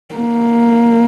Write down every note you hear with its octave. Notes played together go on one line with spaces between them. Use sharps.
A#3